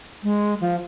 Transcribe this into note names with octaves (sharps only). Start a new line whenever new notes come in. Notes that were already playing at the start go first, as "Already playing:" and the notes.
G#3
F3